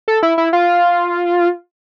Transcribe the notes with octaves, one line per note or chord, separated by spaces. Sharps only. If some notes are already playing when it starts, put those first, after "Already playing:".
A4
E4
E4
F4